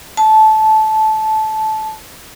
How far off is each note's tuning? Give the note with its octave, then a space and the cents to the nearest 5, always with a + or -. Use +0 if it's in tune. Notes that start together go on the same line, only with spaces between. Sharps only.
A5 -15